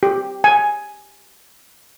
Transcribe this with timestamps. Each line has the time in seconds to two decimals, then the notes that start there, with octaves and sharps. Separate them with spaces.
0.03 G4
0.44 G#5